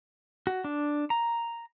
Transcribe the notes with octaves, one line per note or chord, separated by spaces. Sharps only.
F#4
D4
A#5